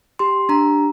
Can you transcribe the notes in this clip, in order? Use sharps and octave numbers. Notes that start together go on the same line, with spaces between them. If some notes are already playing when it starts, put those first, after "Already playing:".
G4 C6
D4 A#5